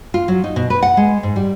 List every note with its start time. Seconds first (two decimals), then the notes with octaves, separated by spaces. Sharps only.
0.14 F4
0.28 F#3
0.44 D#4
0.56 B2
0.70 B4
0.82 F#5
0.97 G#3
1.23 G#2
1.36 G3